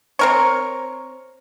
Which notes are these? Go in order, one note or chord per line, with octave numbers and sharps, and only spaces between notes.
C4 A#4 C#5